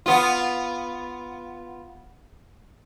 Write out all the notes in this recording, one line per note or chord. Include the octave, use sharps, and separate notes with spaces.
B3 F4